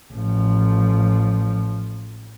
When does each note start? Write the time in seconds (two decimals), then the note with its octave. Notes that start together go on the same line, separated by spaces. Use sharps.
0.13 A1 F3